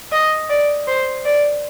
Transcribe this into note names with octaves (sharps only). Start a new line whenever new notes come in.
D#5
D5
C5
D5